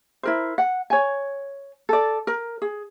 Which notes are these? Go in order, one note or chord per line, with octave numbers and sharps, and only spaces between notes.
E4 A#4 C5
F#5
C#5 G#5
A4 D5
A#4
G#4